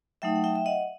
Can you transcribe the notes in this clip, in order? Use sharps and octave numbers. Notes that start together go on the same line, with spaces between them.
F#3 A3 D#4 E5 G5
F#5
E5 G5
E5
D#5 F#5